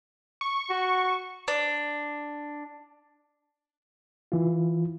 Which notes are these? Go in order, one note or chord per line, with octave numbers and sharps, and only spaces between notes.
C#6
F#4
D4
E3 F4